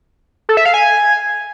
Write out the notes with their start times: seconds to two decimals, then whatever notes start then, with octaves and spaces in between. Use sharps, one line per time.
0.49 A4
0.57 E5
0.65 F5
0.74 G#5